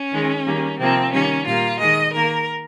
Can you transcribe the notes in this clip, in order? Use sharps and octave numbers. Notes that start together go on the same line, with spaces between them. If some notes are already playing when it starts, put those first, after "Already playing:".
Already playing: C#4
D#3 G#3
D#3 G3 A#3
C3 F3 A#3 C4
D#3 G3 A#3 C#4
A#2 G3 A#3 F4
D#3 G#3 D#5
D#3 A#3 A#4